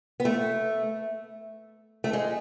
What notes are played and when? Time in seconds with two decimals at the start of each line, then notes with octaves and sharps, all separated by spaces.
0.20 B3
0.25 A3
2.04 A3
2.13 G#3